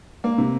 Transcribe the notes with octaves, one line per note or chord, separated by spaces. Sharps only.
A#3
C3